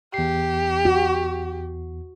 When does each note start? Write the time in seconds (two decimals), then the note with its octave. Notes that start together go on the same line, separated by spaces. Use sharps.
0.14 E2 G4 C7
0.85 F#4